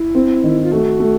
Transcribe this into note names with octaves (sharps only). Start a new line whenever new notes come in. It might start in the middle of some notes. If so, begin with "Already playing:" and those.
Already playing: E4
C4
D#3
F4
A3 F#4
A3